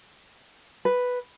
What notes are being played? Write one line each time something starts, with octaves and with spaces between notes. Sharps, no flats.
B4